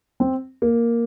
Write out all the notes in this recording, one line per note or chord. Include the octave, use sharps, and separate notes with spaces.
C4
A#3